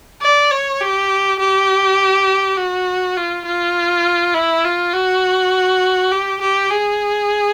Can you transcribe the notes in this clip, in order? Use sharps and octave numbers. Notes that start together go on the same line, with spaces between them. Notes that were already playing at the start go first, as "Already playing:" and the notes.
D5
C#5
G4
G4
F#4
F4
F4
E4
F4
F#4
G4
G4
G#4